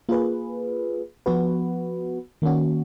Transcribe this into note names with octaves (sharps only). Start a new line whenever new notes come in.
A#3 F4 G#4 B4
F3 B3 F#4 B4
D#3 A#3 C#4 F#4